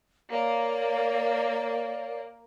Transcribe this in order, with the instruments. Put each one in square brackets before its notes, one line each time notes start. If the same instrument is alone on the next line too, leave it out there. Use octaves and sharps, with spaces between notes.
[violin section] A#3 [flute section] C#5 D5 F5